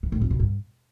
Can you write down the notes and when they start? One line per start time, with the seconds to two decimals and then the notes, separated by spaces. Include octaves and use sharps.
0.03 E3
0.12 A2
0.21 F2
0.30 B2
0.40 G2